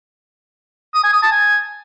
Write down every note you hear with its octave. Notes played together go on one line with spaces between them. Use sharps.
D#6
G#5
D#6
A5
G#5